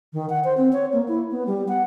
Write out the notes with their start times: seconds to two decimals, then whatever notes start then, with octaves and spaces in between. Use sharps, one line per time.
0.13 D#3
0.30 F#5
0.44 C5
0.57 C4
0.73 C#5
0.93 A#3
1.08 E4
1.31 B3
1.47 G3
1.68 F#5